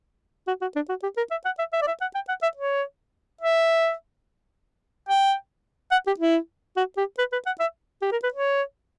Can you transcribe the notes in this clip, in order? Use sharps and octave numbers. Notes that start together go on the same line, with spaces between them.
F#4
F#4
D4
F#4
G4
A#4
E5
F#5
E5
E5
D5
E5
F#5
G5
F#5
E5
C#5
E5
G5
F#5
G4
E4
F#4
G4
B4
B4
F#5
E5
G4
A#4
B4
C#5